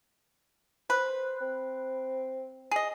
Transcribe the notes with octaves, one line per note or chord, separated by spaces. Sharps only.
B4 C5
C4
G#4 D#5